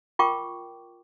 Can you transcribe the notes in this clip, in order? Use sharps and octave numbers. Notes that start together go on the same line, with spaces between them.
F4 A#4 G5 C#6 D6